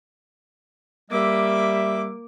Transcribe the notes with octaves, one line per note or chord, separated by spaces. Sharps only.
G3 A#3 E5 D6